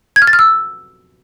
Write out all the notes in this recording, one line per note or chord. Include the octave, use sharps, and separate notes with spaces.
G#6
F6
A6
F6
E6